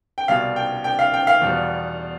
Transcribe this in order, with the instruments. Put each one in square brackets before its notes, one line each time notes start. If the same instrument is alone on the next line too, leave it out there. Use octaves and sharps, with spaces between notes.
[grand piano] G5
C2 B2 G3 F5
G5
G5
F5
G5
F5
E2 B2 G3